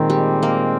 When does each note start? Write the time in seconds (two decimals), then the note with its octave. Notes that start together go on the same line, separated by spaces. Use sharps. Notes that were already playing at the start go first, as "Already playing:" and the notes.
Already playing: A#2 D#3 G#3 C4
0.10 G3
0.43 A#3